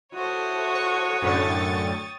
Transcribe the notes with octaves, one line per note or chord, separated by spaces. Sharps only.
E4 F#4 A4 C5 C#5 D#6
C#6
F#2 A2 D3 G5 C#6 A6